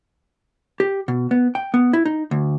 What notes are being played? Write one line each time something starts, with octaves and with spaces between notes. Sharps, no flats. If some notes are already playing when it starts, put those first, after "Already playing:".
G4
B2
B3
G5
B3
E4
D#4
D2